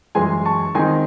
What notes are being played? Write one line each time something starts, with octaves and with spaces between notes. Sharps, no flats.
F#2 E3 G#3 G#5 C6
A5 C#6
D#3 G#3 C4 D#4 G#5 C6